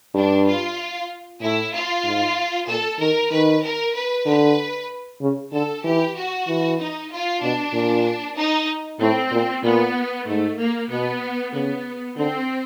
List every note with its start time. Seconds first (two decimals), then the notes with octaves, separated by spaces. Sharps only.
0.14 G2 D4
0.46 F4
1.41 A2 E4
1.73 F4
2.04 G#2
2.67 A#2 A4
2.99 D#3 A#4
3.31 D#3 B4
3.62 A#4
3.94 B4
4.26 D3 B4
5.21 C#3
5.52 D3 A4
5.84 E3 G4
6.15 F#4
6.47 E3
6.79 D#4
7.10 F4
7.42 B2 D4
7.73 A#2
8.37 D#4
9.00 A2 C4
9.32 A#2
9.63 A#2 B3
10.27 G#2 A3
10.59 A#3
10.90 B2 B3
11.53 C#3 B3
12.17 D3 C4